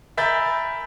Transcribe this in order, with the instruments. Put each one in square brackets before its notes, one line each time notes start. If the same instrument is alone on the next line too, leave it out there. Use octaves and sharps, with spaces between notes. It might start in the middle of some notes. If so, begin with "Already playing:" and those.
[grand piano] A#4 E5 G#5 B5 G6 A6